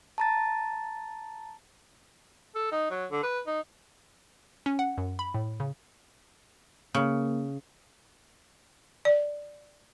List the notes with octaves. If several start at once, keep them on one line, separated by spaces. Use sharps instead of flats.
A5 A#5 A6
A4
D#4
F#3
D3
B4
D#4
C#4
F#5
F#2
B5
A2
C#3
C#3 A#3
D5